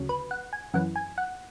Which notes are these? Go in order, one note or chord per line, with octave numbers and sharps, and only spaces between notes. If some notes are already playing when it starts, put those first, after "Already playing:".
Already playing: D2 C#3 F#3
B4
F#5
G#5
F#2 E3 F#5
G#5
F#5